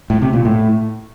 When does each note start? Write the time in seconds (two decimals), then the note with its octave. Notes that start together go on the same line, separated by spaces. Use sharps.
0.10 A2
0.22 C3
0.33 A#2
0.45 A2